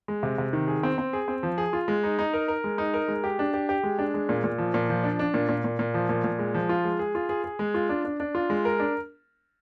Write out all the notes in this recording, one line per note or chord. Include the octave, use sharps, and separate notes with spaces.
G#3
C3
C3
D#3
G#4
C4
C4
G#4
C4
F3
G#4
F4
G#3
D#4
D#4
A#4
A#4
G#3
D#4
A#4
G#3
G4
D4
G4
G4
G#3
D4
G#3
A#2
A#2
F3
A#2
F3
D4
D4
A#2
A#2
A#2
A#2
F3
A#2
A#2
G#3
F3
F4
G#3
G#4
F4
G#4
G#4
G#3
F4
D4
D4
D4
F4
G#3
A#4
D4